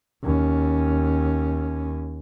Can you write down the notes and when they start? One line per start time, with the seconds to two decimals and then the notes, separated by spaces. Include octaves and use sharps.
0.23 D#2 C#4